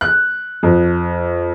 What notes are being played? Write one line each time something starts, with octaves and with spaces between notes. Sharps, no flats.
F#6
F2